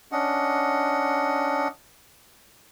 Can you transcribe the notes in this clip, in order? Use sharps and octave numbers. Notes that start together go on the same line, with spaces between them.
C#4 D4 D#5 F#5